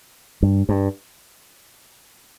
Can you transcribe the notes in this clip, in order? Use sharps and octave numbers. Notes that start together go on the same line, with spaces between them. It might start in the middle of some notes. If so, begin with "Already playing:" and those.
G2
G2